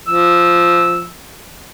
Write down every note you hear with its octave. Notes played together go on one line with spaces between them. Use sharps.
F3 E6